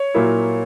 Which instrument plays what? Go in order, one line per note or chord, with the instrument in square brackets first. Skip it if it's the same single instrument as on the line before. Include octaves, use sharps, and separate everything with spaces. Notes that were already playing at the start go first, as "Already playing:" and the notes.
Already playing: [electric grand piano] C#5
[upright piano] A#2 F#3 A#3 E4